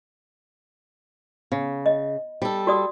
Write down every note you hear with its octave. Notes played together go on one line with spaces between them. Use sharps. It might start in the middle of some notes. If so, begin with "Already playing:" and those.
C#3
D#5
G3 A4
F#4 D5 D#6